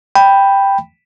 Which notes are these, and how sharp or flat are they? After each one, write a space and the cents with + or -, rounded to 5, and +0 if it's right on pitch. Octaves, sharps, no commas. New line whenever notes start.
G5 +5 B5 +0